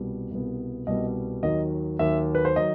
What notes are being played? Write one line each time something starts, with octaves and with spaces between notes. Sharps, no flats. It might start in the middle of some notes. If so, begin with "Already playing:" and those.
Already playing: C2 B2 G3 B3
C2 B2 G3 B3
C2 B2 G3 B3 D#5
D#2 D#3 F#3 D#5
D#2 D#3 F#3 E5
B4
C5
D#3 F#3 D#5